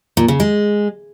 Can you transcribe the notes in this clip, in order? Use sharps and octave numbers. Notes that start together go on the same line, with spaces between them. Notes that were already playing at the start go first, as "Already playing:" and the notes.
A#2
C#3
G#3